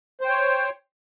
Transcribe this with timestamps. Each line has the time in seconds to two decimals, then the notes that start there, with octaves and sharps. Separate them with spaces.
0.21 C5
0.25 G5
0.29 C#5